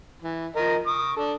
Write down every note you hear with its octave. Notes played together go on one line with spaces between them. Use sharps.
E3
F3 A#4 D#5
C#6 D#6
D4 A4